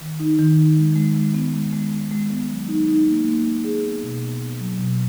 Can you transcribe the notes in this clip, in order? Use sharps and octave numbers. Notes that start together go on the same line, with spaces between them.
D#3
D#4
D#3
D#4
G#3
G#3
G#3
B3
G#3
G#3
G#3
G#3
B3
F#3
D#4
D#4
A#3
A#3
A#3
G#4
B3
B2
B3
B3
F#3
B2